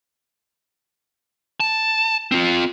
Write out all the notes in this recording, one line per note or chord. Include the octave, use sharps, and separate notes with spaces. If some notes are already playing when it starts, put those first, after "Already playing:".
A5
C4 F4